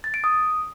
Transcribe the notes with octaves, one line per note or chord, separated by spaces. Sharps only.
A6
D7
D#6